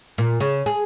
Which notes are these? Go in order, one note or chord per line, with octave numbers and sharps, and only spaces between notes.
A#2
C#3
G#4